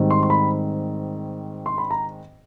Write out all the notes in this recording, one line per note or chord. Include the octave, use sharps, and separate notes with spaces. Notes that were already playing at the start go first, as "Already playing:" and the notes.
Already playing: G#2 D#3 G3 C4
C6
C6
B5
C6
B5
A#5